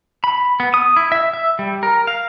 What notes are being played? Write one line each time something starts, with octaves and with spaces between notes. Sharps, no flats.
B5
B3
D#6
E4
E5
E5
G3
A#4
F5